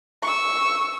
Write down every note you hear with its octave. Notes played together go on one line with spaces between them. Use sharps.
C#6 E6